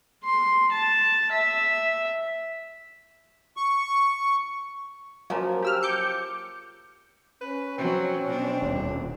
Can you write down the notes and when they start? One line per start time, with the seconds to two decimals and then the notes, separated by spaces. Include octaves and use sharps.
0.24 C6
0.72 A5
1.32 E5
3.57 C#6
5.30 C#3 F3 F#3 A#3
5.63 G4 E6 F6
5.83 D6 G6 C#7
7.41 C#4 B4
7.78 F#3 C4
8.26 B2 D4
8.62 D#1